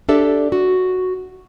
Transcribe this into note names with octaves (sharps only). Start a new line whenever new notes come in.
D4 G4 A4 D5 E5
F#4